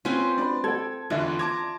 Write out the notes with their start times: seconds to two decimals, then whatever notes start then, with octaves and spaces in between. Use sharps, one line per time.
0.05 C4 C#4 F4 B4 G5 G#5
0.38 D4 B4 D5
0.64 A4 G5 G#6
1.10 E2 D3 E3 F4 D5 E5
1.39 A5 A#5 D6 G#6